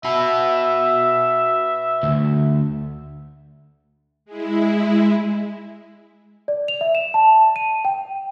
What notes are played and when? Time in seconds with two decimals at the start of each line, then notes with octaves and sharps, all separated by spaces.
0.05 F#4 B4 E5
2.03 D2
4.25 G#3 E4
6.48 D5
6.68 F7
6.81 E5
6.95 E7
7.14 A5
7.56 D#7
7.85 G5